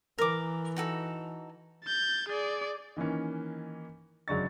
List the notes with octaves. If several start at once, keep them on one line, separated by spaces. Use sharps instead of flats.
E3 A#4 D6
D#4 F#4 A4
G6 A6
G#4 D5
D#3 E3 A#3 C#4
F#1 F#3 G#3 D4 C#6 A6